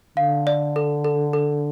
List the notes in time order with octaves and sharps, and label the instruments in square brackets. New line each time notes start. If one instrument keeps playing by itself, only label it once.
[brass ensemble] D3 [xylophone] F5
[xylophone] D5
A4
A4
A4